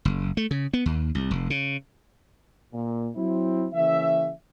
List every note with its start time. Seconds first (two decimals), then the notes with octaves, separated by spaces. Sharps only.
0.05 F#1
0.37 A3
0.51 C#3
0.73 B3
0.86 D#2
1.15 C2
1.31 F1
1.50 C#3
2.73 A#2
3.16 F#3 C4 E4
3.74 C#3 E3 A#3 C#4 E5